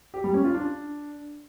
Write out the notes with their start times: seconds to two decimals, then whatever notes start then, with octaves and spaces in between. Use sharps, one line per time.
0.14 G4
0.24 G3
0.34 C#4
0.44 F4
0.54 D4